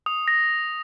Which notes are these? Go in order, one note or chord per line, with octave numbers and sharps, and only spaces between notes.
D#6
A#6